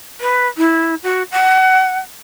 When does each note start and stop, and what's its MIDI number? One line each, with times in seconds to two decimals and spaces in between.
0.21 0.47 71
0.58 0.95 64
1.03 1.23 66
1.32 1.98 78